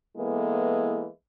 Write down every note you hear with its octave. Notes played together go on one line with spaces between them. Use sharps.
E3 G#3 A#3 B3 E4 A4